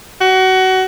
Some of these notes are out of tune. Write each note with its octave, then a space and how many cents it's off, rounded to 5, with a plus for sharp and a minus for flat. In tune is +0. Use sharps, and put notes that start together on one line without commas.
F#4 +25